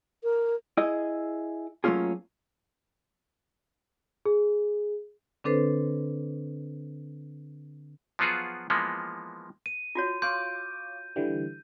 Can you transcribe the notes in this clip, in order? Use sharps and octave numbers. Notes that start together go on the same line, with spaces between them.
A#4
E4 G#4 D#5
F#3 A3 A#3 C#4 F4 G#4
G#4
D3 C4 D4 A4 B4 C5
F3 F#3 B3 F4 F#4 G#4
E3 F3 G#3 A#3 B3
D#7
F4 F#4 C#5
C#5 F5 C6 D6 G6
D3 E3 G3